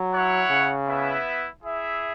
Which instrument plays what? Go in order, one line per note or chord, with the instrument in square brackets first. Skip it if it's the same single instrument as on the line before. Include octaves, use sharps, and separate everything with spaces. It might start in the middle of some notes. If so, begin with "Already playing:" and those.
Already playing: [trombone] F#3
[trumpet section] E4 C#5 F#5
[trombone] C#3
[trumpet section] B3 E4 B4 E5
E4 G#4 E5